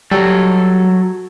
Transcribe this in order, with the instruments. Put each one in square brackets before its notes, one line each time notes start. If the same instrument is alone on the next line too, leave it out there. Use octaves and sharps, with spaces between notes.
[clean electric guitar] F#3 A4 [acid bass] G3